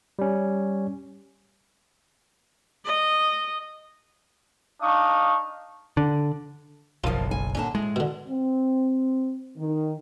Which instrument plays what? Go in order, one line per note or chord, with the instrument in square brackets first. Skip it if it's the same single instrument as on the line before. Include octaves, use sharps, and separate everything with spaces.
[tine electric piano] G3 C#4
[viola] D#5
[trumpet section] D4 D#4 F5 C#6 D#6
[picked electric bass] D3
[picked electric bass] F#1 B1 [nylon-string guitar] F3 A#4 A5 [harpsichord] F4 D#6
[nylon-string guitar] G#5
[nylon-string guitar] A#2 D3 A5 [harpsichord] C#4
[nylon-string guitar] A2 [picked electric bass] G#3
[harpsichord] B2 D3
[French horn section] C4
D#3